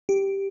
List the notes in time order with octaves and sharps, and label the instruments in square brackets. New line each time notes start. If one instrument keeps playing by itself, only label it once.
[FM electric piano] G4